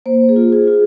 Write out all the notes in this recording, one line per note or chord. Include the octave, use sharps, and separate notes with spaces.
A#3 C5
G#4
F4
G#4
F4